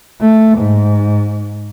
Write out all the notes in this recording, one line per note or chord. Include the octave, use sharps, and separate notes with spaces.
A3
G#2